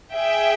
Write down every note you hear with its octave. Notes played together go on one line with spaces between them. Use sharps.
G#4 E5 G5